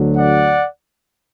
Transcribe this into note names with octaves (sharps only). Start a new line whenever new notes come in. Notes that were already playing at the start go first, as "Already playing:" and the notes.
Already playing: D2 D3 F#3
D5 F#5